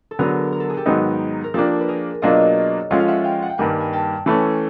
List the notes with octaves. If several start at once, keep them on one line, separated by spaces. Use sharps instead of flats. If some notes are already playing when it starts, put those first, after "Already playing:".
A4
D3 F#3 B3 D4 G#4 A#4
A#4
A4
G#4
G4 A4
G#2 D#3 F#3 B3 D#4 G#4
A#4
F3 A#3 D4 G4 A4
B4
G#4 A#4
B2 F#3 A#3 D4 F4 C#5 D#5
F3 G#3 C#4 F4 A4 F#5
F5
E5 F#5
F5 G5
F#5
G5
G2 D#3 G3 A#3 F#5 G#5
G#5
G5 A5
E3 A3 C#4 A5 B5